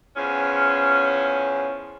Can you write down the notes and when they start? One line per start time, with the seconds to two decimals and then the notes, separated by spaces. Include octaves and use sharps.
0.16 E2 F3 C#4